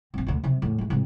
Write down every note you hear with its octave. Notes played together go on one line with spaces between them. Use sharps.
A#1 C4
D2 B2
F#2 C3
E2 A2
G#2 E3
C2 G#2